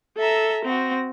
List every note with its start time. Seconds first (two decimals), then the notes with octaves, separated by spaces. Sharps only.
0.17 A4 E5 A#5
0.65 C4 F#4 A#6